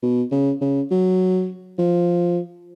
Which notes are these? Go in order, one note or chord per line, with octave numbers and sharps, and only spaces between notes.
B2
C#3
C#3
F#3
F3